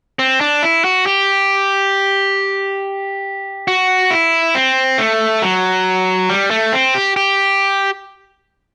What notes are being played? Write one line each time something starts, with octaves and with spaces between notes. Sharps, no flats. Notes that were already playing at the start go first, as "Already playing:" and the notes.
C4
D4
E4
F#4
G4
F#4
E4
C4
A3
F#3
G3
A3
C4
G4
G4